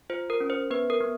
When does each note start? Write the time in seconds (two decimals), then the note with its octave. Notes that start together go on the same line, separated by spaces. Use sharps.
0.10 F4 C5
0.30 A#4
0.40 C#4
0.50 C5
0.71 B3 B4
0.90 A#4
1.01 B3